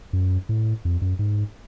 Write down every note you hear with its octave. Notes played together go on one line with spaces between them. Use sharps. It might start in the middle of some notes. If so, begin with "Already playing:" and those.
F#2
A2
F2
F#2
G#2